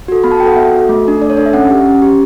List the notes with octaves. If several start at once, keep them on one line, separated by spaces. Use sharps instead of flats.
F#4 A4
B3 B5
A5
F#4 A4 F#5 G5
B3 E5
F#4 A4
A3
D4 A4
A3 D5
C#5
D4 A4 D5
E5
C#4 F#5
G4
C#4
G4